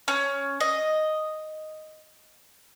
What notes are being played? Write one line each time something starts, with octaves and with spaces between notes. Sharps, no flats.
C#4
D#5